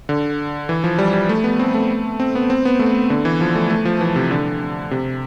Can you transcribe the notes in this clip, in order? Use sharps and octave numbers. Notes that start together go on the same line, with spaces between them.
D3
E3
F3
G3
G3
A3
B3
C4
A3
C4
B3
C4
B3
A3
D3
E3
F3
A3
A3
F3
E3
C3
D3
C3